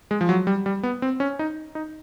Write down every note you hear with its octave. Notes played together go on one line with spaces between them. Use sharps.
G#3
F3
F#3
G3
G3
B3
C4
C#4
D#4
D#4